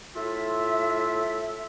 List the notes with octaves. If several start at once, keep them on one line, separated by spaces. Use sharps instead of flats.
A2 F4 E5